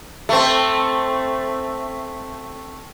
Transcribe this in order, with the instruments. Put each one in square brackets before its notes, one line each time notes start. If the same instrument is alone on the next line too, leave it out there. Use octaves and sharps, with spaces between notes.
[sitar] A3 C4